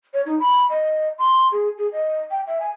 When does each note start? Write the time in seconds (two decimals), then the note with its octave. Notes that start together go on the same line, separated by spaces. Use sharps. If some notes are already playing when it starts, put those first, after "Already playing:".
0.14 C#5
0.26 D#4
0.40 B5
0.70 D#5
1.19 C6
1.52 G#4
1.78 G#4
1.92 D#5
2.31 G5
2.47 E5
2.60 G#5